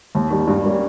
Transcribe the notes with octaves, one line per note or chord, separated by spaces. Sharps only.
D#2
D#3 G3
G2
G3 A#3 C#4